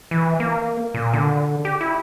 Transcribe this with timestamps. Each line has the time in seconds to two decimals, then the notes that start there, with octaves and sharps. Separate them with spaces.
0.11 E3
0.40 A#3
0.94 A#2
1.13 D3
1.65 G4
1.81 E4